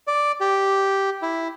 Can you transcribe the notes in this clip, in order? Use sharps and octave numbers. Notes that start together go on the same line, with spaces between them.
D5
G4
E4